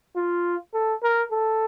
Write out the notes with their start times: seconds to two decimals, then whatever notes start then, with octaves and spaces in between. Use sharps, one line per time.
0.16 F4
0.74 A4
1.03 A#4
1.31 A4